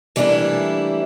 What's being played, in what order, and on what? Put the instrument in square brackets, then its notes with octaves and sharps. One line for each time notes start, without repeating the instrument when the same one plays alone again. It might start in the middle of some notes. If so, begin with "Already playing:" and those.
[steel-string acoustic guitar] E3 G3 A3 A#3 D4 E4